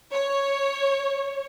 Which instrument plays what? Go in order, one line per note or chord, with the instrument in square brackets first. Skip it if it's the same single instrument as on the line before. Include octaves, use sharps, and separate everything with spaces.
[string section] C#5